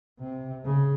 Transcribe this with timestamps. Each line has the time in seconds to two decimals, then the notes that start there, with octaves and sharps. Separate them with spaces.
0.19 C3
0.65 C#3